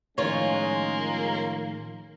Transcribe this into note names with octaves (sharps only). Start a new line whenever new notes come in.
A2 D#3 F3 G#3 A#3 C#4 F4 C#5